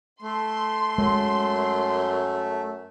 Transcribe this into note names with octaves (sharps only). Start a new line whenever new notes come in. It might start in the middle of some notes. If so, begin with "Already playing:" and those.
A3 C6
F#2 G#3